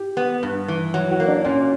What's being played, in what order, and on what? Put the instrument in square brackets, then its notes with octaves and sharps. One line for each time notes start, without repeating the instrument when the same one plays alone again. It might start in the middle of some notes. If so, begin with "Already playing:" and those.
Already playing: [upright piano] G4
[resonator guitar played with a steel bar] B3
[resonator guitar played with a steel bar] G2 [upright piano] B4
[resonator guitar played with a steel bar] E3
F#3
[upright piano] F#4
[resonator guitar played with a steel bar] A#3
[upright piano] D4
[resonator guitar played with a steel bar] A#2 [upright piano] C#4